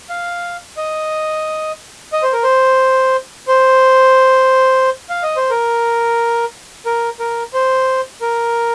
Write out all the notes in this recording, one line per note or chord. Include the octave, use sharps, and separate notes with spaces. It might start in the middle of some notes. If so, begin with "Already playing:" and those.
F5
D#5
D#5
C5
A#4
C5
C5
F5
D#5
C5
A#4
A#4
A#4
C5
A#4